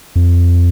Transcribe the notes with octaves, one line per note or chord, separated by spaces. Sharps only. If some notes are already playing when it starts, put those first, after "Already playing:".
F2